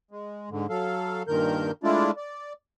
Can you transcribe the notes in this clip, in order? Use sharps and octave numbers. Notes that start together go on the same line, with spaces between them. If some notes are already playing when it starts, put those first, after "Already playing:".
G#3
G#2 D3
F#3 A4 F5
G2 A#2 D#3 A#4 G6
G#3 A3 D4 E4 F4 D5
D5